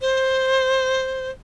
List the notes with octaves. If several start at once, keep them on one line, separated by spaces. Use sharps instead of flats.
C5